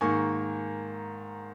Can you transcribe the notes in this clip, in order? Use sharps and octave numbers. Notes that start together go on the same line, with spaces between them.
G#2 D#3 A#3 G#5 C#6